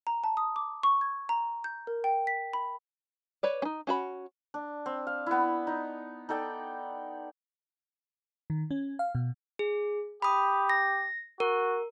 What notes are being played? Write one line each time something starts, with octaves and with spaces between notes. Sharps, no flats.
A#5
A5
D#6
D6
C#6
G#6
A#5
G6
A#4
G5
B6
B5
B4 C#5 D5
C#4 D#4
C#4 F#4 B5
D4
C4
F5
B3 E4
D#4
D#4 A4 D5 G5
D#3
C#4
F5
B2
G#4
G4 B5 D#6
A#6
F#4 A#4